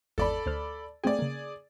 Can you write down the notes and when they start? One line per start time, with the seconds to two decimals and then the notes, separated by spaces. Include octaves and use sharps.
0.18 G#1 E2 A4 D5 B5
0.46 D2 C5 F6
1.04 A3 C4 G#4 D5 G5
1.19 C#3 A#3